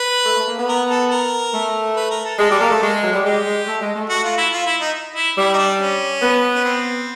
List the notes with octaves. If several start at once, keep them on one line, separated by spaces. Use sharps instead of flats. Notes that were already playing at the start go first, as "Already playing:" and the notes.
Already playing: B4
A3
A3
A#3
B3
A#4
A4
A#4
A3
B4
A#4
A4
G#3 A4
G3
A#3
A3
G#3
F#3
G3
G#3 G4
G#3
A3
G#3
A3
F#4
F4
E4
F4
E4
D#4
E4
G3 E4
D#4
D4
C#4
B3
C#4
C4